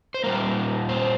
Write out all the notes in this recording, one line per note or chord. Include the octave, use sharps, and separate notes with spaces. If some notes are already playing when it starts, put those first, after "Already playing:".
C5
A#2 G3 A#3 A#4
C5